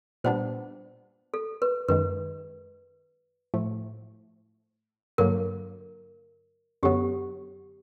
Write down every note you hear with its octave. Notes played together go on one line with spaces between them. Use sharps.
A#2 G3 B3 D4 C5
A4
B4
F#2 D#3 G#3 B4
A2 F3 A3
G2 D3 F#3 A#3 A#4
F#2 D3 F#3 B3 G4